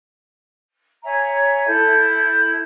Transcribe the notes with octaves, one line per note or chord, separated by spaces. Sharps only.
C#5 E5 G#5 A#5
E4 A4 G6